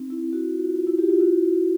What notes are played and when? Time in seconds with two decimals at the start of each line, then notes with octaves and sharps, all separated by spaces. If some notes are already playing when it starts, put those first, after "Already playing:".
Already playing: C4 D#4
0.10 E4
0.33 E4 F#4
0.54 F4
0.76 F4
0.87 E4 F#4
0.98 F4 G4
1.10 F4
1.20 E4 F#4